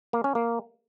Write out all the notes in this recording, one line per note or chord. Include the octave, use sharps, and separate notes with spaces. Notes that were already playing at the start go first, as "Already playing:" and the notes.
A#3
C#4
A#3